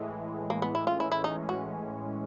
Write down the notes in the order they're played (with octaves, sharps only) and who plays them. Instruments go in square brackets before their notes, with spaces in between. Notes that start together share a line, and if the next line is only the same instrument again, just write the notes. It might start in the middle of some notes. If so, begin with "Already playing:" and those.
Already playing: [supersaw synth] A2 E3 G#3
[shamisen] A#3
B3
E4
[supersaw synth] A2 E3 G#3 C#4 [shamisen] F4
[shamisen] E4
E4
D#4
F#4